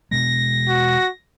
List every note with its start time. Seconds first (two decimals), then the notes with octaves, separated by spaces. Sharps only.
0.11 E1 B2 G#3 A#6
0.69 F#4